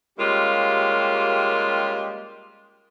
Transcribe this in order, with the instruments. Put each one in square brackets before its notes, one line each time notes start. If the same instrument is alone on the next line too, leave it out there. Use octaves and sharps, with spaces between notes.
[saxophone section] G3 G#3 A#3 C#4 F4 G4